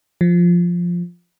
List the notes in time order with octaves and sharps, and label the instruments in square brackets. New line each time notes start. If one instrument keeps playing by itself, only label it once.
[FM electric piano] F3